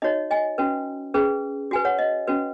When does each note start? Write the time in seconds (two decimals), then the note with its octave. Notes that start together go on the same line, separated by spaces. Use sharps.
0.02 D#4 F#4 C#5 D#5
0.30 D#5 G#5
0.58 C#4 F#4 B4
1.14 C#4 G#4 B4
1.71 F#4 B4 G#5
1.85 C#5 F#5
1.99 D#5
2.27 C#4 F#4 B4